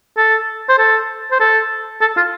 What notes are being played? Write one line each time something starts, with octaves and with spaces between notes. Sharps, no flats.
A4
C5
A4
C5
A4
A4
F4